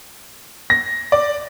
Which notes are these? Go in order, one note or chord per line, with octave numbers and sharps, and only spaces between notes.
A#6
D5